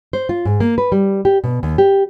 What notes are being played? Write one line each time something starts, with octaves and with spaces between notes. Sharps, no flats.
C5
F4
G#2
A#3
B4
G3
G4
B2
D#2
G4